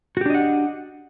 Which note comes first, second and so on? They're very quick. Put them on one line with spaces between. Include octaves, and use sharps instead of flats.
F#4 G4 D4 D#5 F#5